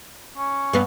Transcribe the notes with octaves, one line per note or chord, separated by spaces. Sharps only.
C#4
G2 B3